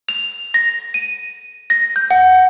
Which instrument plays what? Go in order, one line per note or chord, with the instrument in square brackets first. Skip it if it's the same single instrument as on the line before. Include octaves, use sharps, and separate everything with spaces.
[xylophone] F7
A#6
D#7
A#6
G6
F#5